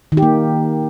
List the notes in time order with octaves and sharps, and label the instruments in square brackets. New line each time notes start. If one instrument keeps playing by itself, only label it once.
[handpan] D#3
G4
A#3